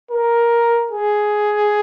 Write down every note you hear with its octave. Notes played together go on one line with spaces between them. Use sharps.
A#4
G#4